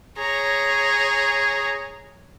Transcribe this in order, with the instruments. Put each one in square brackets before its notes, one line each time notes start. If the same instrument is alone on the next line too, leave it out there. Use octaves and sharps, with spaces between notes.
[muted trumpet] G#4 [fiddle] C#5 A#5